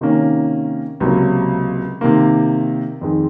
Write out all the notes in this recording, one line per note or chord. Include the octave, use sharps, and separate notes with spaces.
C3 D#3 A#3 C#4
C#2 C3 F#3 A#3
C3 D#3 A#3
F2 D#3 G#3